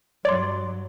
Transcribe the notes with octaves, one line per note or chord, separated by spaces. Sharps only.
G2 F#3 C#5 D5 C6